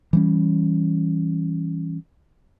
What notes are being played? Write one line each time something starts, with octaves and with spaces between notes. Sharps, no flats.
E3 G3 C#4